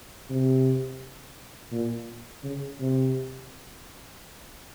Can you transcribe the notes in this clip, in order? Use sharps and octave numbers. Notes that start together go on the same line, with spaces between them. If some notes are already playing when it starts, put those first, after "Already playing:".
C3
A#2
C#3
C3